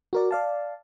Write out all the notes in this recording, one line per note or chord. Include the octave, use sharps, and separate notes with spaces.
F#4 A#4 D5
D5 F5 A5